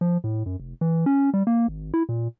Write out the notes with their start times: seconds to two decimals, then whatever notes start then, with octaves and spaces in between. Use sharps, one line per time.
0.01 F3
0.24 A2
0.46 F#2
0.60 F1
0.81 E3
1.06 C#4
1.34 G3
1.47 A#3
1.68 G#1
1.94 E4
2.09 A#2